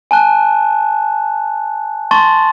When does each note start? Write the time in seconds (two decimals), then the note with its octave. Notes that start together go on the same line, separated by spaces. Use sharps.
0.11 G#5 A5 F#6
2.11 A5 C6 C#6 A6